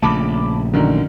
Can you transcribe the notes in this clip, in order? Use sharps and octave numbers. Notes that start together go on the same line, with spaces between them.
A#1 C#3 A3 A5 B5 D6
F#2 D3 D#3